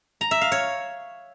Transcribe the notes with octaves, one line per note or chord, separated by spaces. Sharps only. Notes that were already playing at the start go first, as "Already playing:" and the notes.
A#5
E5
F5
C#5